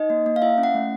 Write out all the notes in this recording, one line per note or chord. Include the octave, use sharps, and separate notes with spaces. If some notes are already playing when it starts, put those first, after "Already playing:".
Already playing: D#4 D#5
A#3
A#3
F5
E4 E5
C#4
F#5
A3